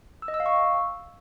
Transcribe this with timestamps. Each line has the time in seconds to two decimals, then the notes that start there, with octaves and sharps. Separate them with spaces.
0.22 E6
0.28 D#5
0.34 E6
0.40 F5
0.46 C#6